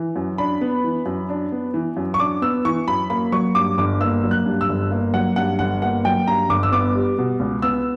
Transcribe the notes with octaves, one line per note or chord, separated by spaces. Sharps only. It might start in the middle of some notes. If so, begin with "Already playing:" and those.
Already playing: E3
F#2
D4 B5
B3
E3
F#2
D4
B3
E3
F#2
C#6
D4 D6
B3 E6
E3 C#6
F#2 B5
A#3 B5
F#3 C#6
G2 D6
G1 D6
A#3 E6
F#3
F#6
G2
E6
G1
A#3
F#3 F#5
G2 F#5
G1 F#5
A#3 F#5
F#3 G5
G2 A#5
G1 D6
E6
B3 D6
G3
B2
C#2
B3 E6